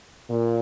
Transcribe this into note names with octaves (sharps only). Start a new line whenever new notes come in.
A#2